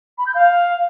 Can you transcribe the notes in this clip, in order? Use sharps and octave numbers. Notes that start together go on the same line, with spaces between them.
B5
G6
F5